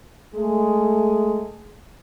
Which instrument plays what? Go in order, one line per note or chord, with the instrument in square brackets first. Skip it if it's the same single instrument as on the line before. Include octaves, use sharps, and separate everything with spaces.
[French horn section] G#3 A3 G#4